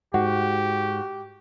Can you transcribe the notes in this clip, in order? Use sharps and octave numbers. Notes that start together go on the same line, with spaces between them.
G#2 F#4 G4 F#5